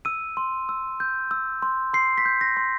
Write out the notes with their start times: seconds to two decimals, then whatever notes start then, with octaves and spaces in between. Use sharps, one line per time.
0.05 E6 D#7
0.37 C6
0.69 E6
1.00 G6
1.31 E6
1.62 C6
1.94 C6 C7
2.18 B6
2.25 G6
2.41 A#6
2.57 C6